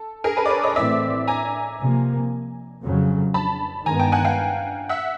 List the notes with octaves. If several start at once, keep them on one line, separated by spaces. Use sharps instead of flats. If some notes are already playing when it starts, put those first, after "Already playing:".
Already playing: A4
G#4 A#4
A4 B4
D5
B4 C#5
C#5 D#5
A2 E3 A3 C4 D5 E5
G#5 A#5
C3 F3 A#3
F2 C#3 F#3
A5 B5
G2 D#3 G#3 B3 G#5 A#5
G5 A5
F#5 G#5
F5 G5
E5 F#5